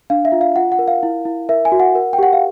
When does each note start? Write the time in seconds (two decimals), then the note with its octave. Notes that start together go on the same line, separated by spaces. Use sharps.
0.10 D4 F5
0.25 E5
0.32 F4
0.41 F5
0.56 F4 F#5
0.72 F#5
0.79 A#4
0.88 F5
1.03 E4
1.25 E4
1.49 A#4 E5
1.65 G#5
1.72 F#4
1.80 F#5
1.95 A#4
2.13 G5
2.18 G4 F#5
2.33 F5